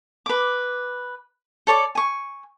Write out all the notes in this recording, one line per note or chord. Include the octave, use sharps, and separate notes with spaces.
B4 D6
A4 C#5 D5 D6
G#5 C#6